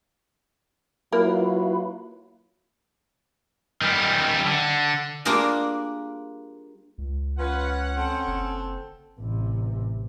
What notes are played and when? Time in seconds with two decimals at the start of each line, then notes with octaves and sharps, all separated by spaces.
1.12 F#3 A#3 E4 F4 B4
3.81 D#3 G3
4.45 D3
5.25 G3 A#3 D4 F4 G#4 A#4
6.98 C#2
7.39 C#4 F4 B4 F#5
7.96 C4 A4
8.27 F#1
9.20 A1 C3